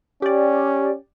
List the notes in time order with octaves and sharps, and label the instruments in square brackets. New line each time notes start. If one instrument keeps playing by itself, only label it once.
[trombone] C#4 [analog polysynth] G4 D5